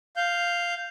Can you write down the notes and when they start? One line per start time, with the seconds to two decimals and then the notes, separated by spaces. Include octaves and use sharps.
0.17 F5 G6